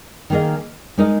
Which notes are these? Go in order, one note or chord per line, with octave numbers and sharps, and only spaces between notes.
D#3 A#3 G#4 D#5
G#3 D#4 A#4 D#5